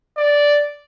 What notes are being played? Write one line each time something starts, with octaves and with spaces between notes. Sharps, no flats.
D5